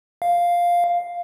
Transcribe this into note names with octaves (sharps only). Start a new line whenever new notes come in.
F5